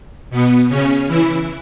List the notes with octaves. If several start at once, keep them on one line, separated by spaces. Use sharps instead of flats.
B2 B3
C#3 C#4
E3 E4